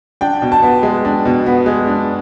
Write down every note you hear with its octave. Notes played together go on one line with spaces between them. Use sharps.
D4 G5
B2
A5
B3
G#3
D4
B2
B3
G#3
D4